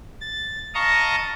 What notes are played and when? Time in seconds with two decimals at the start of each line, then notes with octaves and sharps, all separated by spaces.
0.21 A6
0.74 D#5 F5 A5 A#5 C#6 D#6